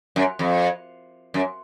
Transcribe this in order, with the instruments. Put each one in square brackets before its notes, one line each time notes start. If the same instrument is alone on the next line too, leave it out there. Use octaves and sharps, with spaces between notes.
[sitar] F#2
F2
F#2